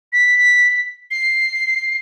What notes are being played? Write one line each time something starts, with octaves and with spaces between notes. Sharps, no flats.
B6
C7